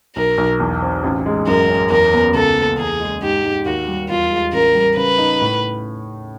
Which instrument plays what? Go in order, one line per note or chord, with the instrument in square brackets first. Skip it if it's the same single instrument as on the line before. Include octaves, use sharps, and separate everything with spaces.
[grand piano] B1 [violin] A#4
[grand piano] B1
E2
C4
A1
G#3
[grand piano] F#2 [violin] A#4
[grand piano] C#4
[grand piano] E2 [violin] A#4
[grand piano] B3
[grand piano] C#2 [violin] A4
[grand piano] A#3
[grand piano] E2 [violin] G#4
[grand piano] G#3
[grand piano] G#2 [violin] G4
[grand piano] G#2
[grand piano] D#2 [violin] F#4
[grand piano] G3
[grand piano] E2 [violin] F4
[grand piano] G#3
[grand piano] A1 [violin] A#4
[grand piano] G3
[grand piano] C#3 [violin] B4
[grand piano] D#4
A2